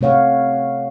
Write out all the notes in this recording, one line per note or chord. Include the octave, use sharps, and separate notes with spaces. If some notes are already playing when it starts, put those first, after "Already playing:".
C3 A3 C#5 F5 F#5